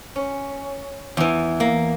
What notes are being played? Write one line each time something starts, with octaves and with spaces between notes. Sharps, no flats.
C#4
E2 E3
A#3